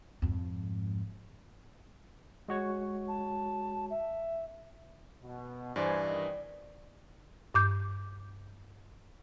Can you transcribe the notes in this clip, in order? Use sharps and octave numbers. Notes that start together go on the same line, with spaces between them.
F2 G#2
G#3 F#4 C#5
A5
E5
B2
G2 E3 C5 D5 G#5
D#3 D#5
G2 D6 G6